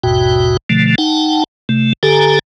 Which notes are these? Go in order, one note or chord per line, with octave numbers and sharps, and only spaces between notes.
A1 E2 G#2 B2 F#4 G5
B2 D3 F3 A3
D#4 F#5 G5 A5
C3 A3
D3 G4 A4 G#5 A#5